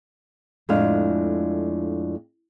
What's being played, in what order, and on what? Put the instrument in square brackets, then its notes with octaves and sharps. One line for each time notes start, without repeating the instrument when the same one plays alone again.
[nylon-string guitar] F2 A2 G#3 D4 F5